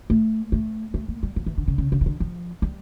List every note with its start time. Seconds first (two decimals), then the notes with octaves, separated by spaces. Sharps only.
0.10 A3
0.52 A3
0.94 A3
1.08 A#3
1.23 G3
1.36 F3
1.46 E3
1.58 D3
1.68 C#3
1.78 C#3
1.92 C#3
2.01 E3
2.06 D3
2.20 F3
2.62 G3